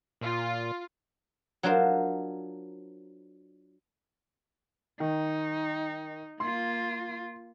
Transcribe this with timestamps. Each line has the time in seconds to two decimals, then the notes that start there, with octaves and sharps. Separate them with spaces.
0.21 A#2 F4
1.63 F#3 D4 F4 A#4 C5
5.00 D#3 D#4
6.40 A#3 F4 C6